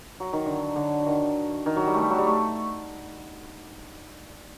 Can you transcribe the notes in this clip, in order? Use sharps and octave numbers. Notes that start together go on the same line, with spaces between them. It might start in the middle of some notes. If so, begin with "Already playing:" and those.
F#3
D#3
D3
D3
D#3
D#3
F#3
G3
A3
G3
F#3
G3
A3